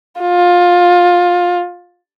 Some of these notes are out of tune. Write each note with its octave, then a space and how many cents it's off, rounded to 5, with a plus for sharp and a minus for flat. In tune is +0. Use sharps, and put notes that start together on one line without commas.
F4 +20